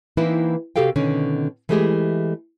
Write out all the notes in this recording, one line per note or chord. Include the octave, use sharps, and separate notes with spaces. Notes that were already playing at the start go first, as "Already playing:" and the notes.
E3 A#3 C4 D#4 E4 B4
C3 F#4 G4 A4 F5 G5
B2 D3 D#3 C#4
E3 G#3 A3 B3 G4 G#4